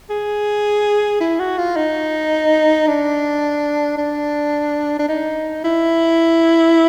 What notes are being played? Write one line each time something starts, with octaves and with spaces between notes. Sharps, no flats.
G#4
E4
F#4
F4
D#4
D4
D4
D4
D#4
E4